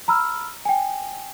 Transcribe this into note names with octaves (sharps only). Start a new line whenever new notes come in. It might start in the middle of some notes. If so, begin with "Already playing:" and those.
A#5 B5 E6 F6
G5 G#5